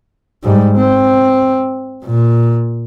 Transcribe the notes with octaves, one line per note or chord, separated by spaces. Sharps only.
G#2 G3
C4
A#2